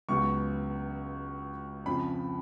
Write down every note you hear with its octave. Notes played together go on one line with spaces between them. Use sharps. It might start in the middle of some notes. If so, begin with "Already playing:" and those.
C#2 C#3 F#3 B3 C#6
F2 C#3 F3 B5